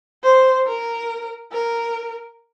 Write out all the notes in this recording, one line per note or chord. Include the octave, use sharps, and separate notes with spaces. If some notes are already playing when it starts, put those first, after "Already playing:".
C5
A#4
A#4